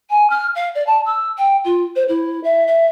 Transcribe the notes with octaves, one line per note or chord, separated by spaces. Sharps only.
G#5
F6
F5
D5
A5
E6
G5
F4
C5
E4
E5
E5